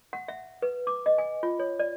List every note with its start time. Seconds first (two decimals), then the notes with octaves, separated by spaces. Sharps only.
0.13 F#5
0.28 E5
0.62 B4
0.87 D6
1.06 D#5
1.18 G#5
1.43 F4
1.59 C#5
1.79 D5